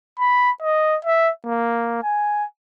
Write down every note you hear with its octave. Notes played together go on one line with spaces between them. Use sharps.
B5
D#5
E5
A#3
G#5